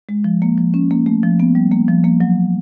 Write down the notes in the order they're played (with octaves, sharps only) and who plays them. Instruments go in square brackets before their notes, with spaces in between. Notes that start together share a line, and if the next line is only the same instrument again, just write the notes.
[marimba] G#3
F3
A#3
F3
C#4
A#3
A3
F3
B3
G3
A#3
F3
A#3
F#3